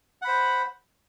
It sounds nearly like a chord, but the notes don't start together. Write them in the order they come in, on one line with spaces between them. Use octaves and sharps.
F#5 B5 C5